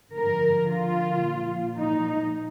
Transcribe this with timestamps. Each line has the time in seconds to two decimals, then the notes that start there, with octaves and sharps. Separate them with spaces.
0.14 D3 F3 A#4
0.70 F4
1.25 A#2 F3
1.80 D#4